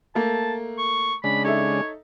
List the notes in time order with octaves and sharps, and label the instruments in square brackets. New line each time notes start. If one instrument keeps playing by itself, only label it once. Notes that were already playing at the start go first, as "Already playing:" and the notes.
[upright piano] A3 A#3 [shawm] A5
[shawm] C#6
[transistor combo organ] C#3 G#3 D4 [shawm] B5
[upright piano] D#4 A4 E5 [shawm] C#5